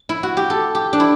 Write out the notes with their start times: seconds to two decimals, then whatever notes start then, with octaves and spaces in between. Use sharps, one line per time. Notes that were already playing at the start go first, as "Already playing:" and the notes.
Already playing: D4
0.09 E4
0.23 F#4
0.37 G4
0.50 A4
0.75 G4
0.93 D4
1.00 E4